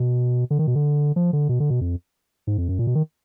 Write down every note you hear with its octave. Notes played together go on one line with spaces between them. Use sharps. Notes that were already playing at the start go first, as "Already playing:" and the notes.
Already playing: B2
D3
D#3
B2
D3
F3
D3
B2
D3
B2
F2
G#2
F2
F#2
A#2
B2
D#3